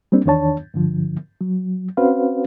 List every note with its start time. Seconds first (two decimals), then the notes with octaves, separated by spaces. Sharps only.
0.12 G3 A#3 C4 D4
0.26 E2 D#3 D4 C#5 A5
0.74 G2 D3 F3
1.41 F#3
1.97 C4 C#4 F#4 B4 C5 F5